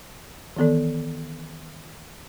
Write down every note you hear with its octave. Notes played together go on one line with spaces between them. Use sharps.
D#3 E3 B3 A4 D5